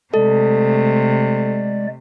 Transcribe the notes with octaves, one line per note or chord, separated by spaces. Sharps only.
C3 G#3 A3 A4 D5